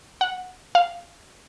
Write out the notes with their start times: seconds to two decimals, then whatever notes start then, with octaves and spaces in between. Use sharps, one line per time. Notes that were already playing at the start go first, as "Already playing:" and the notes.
0.21 F#5
0.75 F5